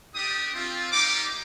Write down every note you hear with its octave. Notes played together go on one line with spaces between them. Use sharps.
A3 D4 G4 D#6
C4 F4
G3 A#3 D#4 G4 D6